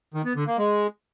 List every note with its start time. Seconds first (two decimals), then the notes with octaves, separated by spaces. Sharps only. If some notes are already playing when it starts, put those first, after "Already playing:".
0.14 D#3
0.25 B3
0.36 D3
0.47 A#3
0.58 G#3